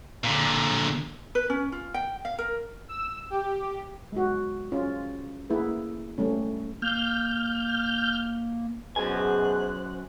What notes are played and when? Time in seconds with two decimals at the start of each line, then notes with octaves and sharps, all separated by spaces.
0.24 A#2 D3
1.35 B4
1.50 C#4
1.72 F4
1.94 G5
2.25 F5
2.38 A#4
2.88 E6
3.30 G4
4.12 G#3 F#4
4.72 C#4 F4
5.50 A#3 E4 G#4 B4
6.18 G3 A3 C#4
6.82 A#3 F6 G6
8.96 F#2 B2 G#4 C5 G#5 F#6